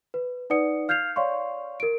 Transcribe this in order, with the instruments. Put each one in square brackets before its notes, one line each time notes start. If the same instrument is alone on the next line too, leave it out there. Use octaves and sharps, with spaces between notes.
[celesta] B4
D#4 B4 D5 F#5 D#6 C#7
F5 F6 G6 G#6 C7 F7
C#5 D5 F5 C6 C#6
A#4 D7